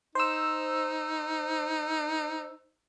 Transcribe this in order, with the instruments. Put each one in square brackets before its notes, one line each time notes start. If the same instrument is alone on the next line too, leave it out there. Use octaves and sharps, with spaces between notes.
[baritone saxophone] D#4 [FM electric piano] C5 E6